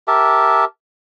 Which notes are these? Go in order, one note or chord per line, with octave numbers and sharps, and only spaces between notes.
G4 A#4 E5 A5